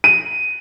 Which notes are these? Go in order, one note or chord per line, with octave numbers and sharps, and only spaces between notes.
D#7